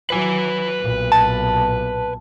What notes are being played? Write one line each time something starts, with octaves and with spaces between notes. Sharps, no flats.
F#3 B4 G#5
B1 A#2
A5